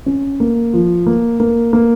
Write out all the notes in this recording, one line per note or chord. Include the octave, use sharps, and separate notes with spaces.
C#4
A#3
F3
A#3
A#3
A#3